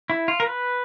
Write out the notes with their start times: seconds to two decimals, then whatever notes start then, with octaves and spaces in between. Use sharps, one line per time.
0.10 E4
0.28 F4
0.40 A#4
0.46 B4